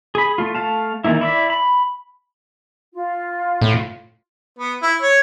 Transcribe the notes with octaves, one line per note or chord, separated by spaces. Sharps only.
G#4 B5
A3 F4
A3 F5 A5
D#3 E3 A3 A#3 E4
E4 D5 E5
B5
F4
A2
B3
E4
C#5